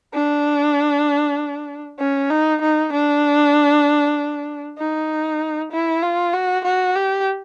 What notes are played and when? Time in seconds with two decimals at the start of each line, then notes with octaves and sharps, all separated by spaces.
0.14 D4
1.99 C#4
2.31 D#4
2.62 D#4
2.93 D4
4.78 D#4
5.72 E4
6.02 F4
6.33 F#4
6.65 F#4
6.96 G4